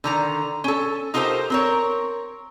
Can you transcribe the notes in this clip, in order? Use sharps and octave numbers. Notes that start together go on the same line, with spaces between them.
D3 D#3 A#5
C#4 A4
D#4 F4 G4 A4 A#4 C5
C4 A#4 C#5